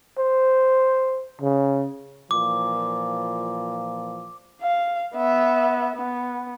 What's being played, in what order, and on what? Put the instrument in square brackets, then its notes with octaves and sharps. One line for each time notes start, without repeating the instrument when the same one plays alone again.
[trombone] C5
C#3
[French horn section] A#2 E3 F3 [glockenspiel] D6
[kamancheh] F5
B3 E5
B3